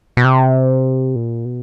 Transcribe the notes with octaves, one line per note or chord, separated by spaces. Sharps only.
B2
C3
A#2
B2